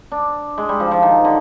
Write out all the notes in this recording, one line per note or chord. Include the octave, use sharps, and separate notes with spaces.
D4
G#3
G3
F3
F3
D#3
D3